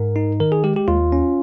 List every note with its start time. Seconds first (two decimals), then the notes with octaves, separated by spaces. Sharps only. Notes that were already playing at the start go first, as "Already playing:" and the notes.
Already playing: G#2 A#4
0.16 D#4
0.40 D#3 A#4
0.52 G#4
0.64 G#3 G4
0.76 G4
0.88 D#2 F4
1.12 C#4